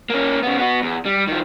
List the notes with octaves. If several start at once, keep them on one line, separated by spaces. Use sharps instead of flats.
A#3 C#4
C#3 B3
B3 F#4
E2
G3
D#3 F3